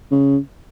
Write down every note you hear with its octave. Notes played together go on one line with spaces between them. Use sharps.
C#3